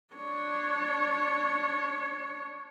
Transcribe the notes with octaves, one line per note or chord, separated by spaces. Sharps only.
D4 C#5